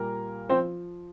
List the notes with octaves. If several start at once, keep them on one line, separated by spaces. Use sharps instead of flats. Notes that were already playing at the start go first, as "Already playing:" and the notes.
Already playing: A#2 G3 A#3 A#4
F3 C4 C5